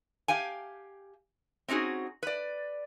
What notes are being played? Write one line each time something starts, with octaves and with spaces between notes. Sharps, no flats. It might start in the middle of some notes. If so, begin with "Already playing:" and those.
G4 F5 G5 G#5
C4 C#4 D#4 F#4 G#4
B4 D5